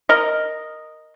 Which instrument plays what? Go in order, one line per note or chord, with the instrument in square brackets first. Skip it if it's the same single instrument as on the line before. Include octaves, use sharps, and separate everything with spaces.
[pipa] A#4 D#5